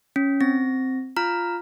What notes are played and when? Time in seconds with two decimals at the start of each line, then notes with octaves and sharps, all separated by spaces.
0.16 C#4
0.41 C4 A#6
1.17 F4 A#5 F6